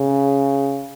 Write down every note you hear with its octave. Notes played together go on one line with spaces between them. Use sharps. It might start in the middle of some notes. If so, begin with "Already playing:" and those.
Already playing: C#3